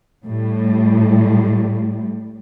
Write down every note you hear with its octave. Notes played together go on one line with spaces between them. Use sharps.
A2 G3